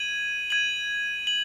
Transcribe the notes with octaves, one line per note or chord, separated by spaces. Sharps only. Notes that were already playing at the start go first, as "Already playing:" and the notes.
Already playing: G#6 D#7 F#7
G#6 D#7 F#7
F#7